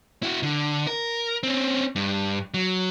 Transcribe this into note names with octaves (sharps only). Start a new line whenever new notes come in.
E4 F#4
D3
A#4
C4 C#4
G2
F#3